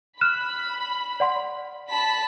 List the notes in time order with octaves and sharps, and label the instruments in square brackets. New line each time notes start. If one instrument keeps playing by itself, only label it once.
[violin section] B5 [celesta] F6 F#6 E7
[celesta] D5 F#5 C6
[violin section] A5 B5 B6